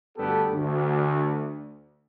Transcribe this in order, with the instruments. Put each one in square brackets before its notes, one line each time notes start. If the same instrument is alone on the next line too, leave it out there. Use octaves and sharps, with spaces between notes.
[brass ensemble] D2 G2 B3 G4 A4
D2